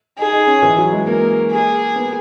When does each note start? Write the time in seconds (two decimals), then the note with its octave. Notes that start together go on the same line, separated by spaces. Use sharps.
0.18 D#4 G#4
0.33 D#4
0.47 C#4
0.63 E3
0.77 F#3
0.93 G#3
1.07 A#3 A#4
1.51 G#4
1.96 B3